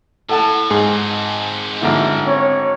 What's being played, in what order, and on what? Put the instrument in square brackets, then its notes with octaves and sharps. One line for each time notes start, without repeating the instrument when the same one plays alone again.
[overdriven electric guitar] A2 [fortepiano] A4 F#5 A5
[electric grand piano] G#2 G#4 [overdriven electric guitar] C4 D#4
[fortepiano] G#1 D3 E4
[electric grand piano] C4 [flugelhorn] C#5